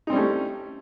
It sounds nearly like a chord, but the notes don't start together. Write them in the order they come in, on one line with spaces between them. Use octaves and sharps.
D#4 C4 G3 C#4 A3